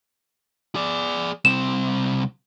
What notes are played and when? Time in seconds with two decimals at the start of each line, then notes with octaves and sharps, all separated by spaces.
0.75 G#4 D5
1.45 C2 C4 E7